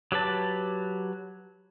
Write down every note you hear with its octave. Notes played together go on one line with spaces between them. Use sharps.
F#3 G4 B4 A5